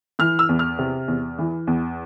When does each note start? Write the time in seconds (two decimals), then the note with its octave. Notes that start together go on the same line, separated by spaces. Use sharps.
0.19 E3 F6
0.39 E6
0.49 E2
0.59 F6
0.79 C3
1.08 E2
1.39 E3
1.67 E2